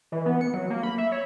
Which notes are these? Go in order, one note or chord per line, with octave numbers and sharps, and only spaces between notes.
E3
B3
C#7
F#3
A#3
B5
E5
C#5